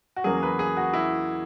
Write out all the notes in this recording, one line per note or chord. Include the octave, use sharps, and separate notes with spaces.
F#4
E2 C#3 F#3 A#3 G#4
B4
G#4
F#4
E4